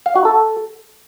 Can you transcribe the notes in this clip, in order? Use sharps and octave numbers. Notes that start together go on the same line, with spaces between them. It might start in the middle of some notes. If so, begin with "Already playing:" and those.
F5
F#4
A4